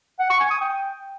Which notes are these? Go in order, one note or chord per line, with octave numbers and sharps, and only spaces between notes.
F#5
C#6
G#5
D#6
G5